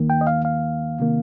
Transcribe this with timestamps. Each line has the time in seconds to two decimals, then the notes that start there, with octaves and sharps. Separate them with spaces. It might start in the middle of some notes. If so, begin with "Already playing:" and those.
Already playing: D#2 D#3 A#3
0.10 G5
0.21 D#5
0.27 F5
0.45 F5
1.00 C3 D#3 A#3